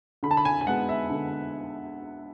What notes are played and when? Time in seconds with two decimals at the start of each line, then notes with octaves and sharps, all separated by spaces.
0.23 D3 B5
0.31 A5
0.37 B5
0.45 G#5
0.61 G#5
0.66 G#3 B3 F#5
0.89 E5
1.10 D3